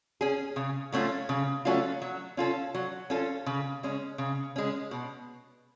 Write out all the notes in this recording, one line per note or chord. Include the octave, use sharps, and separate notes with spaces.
C#4 G#4
C#3
F#3 A3 C#4 F4
C#3
F#3 A3 C#4 F4
F#3
C#4 F4 A4
F#3
C#4 F4 A4
C#3
G#3 C#4
C#3
G#3 C#4
B2